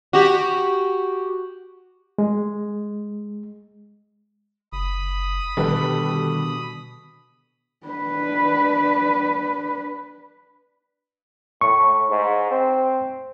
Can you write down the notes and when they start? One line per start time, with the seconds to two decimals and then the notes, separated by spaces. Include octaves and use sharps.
0.13 F#4 G4
2.18 G#3
4.72 F#1 B5 D#6
5.57 B2 D3 D#3 G3 A4 B4
7.87 D4 B4
11.61 A2 C#6
12.10 G#2
12.51 C4